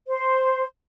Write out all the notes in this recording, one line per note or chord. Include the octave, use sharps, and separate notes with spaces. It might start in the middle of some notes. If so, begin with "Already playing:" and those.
C5